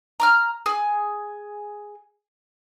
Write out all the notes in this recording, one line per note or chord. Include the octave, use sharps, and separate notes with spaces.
A#5 D6 F6
G#4 G#5